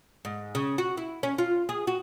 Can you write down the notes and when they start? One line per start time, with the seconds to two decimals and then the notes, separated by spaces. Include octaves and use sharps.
0.25 G#2
0.55 C#3
0.78 F#4
0.97 E4
1.23 C#4
1.38 F4
1.69 G#4
1.87 F#4